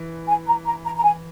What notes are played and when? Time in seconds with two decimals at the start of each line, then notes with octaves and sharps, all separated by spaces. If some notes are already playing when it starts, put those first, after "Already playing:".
Already playing: E3
0.28 G#5
0.46 A#5
0.66 A#5
0.85 A#5
0.97 A#5
1.04 G#5